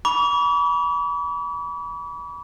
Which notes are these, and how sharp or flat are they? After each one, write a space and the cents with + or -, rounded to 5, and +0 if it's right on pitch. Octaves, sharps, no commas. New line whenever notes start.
B5 -25 D6 -45